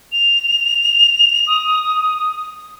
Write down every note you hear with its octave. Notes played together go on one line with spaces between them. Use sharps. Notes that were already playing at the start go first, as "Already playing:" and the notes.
F7
D#6